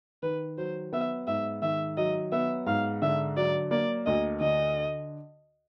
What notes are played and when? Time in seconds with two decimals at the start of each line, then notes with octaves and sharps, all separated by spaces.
0.23 D#3 B4
0.58 F#3 C5
0.93 B3 E5
1.27 G#2 E5
1.62 D#3 E5
1.97 F#3 D#5
2.32 B3 E5
2.66 G#2 F5
3.02 D3 E5
3.37 F#3 D5
3.71 A#3 D5
4.06 D2 D#5
4.41 D3 D#5